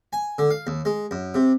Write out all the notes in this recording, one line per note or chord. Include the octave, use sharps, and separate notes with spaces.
G#5
D3
F5
D#2
G#3
F#2
C3